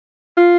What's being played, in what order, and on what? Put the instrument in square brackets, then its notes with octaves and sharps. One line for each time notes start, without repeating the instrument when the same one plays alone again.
[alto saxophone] F4